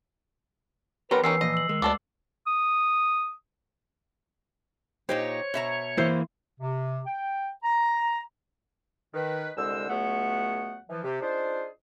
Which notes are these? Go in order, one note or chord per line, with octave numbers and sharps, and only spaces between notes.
D#3 F#3 B3 G4 A#4 B4 C6
D#3 E3 C#4 D#4 E6 C7
A#2 F3 D#5
E6 F#7
D#3 G#3
D2 B3 A4 D5 D6
D#6
A#2 D#4 G4 C5 C#5
B2 E5 A#5
E3 A#3 E4 C5
C3
G5
A#5
D#3 B4
C2 D3 G#3 C5 E6
C#2 F#3 A3 B3 F#5
E3 F3
C3 G4
D4 D#4 F4 G#4 C5